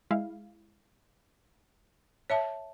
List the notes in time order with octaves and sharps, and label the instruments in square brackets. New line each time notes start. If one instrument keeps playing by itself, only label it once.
[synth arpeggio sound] G#3 E4 F5
[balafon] C#5 E5 A5